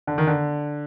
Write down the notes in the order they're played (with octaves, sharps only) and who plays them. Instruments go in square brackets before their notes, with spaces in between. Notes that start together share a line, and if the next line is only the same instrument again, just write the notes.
[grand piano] D3
D#3
D3